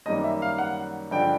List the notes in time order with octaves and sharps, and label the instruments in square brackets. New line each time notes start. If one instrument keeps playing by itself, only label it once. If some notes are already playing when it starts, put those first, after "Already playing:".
[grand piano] F#2 D#3 G3 A#3 D#5
E5
F5
F#5
G2 D3 F3 G#3 G5